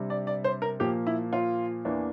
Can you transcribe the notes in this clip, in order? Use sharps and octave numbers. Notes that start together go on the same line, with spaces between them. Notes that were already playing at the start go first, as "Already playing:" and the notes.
Already playing: C3 G3 D4
D5
D5
C5
A#4
A#2 F3 A#3 G4
E4
F4
E2 E3 A#3 D4